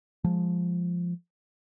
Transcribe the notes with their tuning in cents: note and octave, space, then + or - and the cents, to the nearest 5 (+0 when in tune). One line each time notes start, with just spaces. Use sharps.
F3 +0 G#3 -10